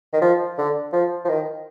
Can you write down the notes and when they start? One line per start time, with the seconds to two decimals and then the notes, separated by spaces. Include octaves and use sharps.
0.13 D#3
0.21 F3
0.58 D3
0.93 F3
1.24 F3
1.29 D#3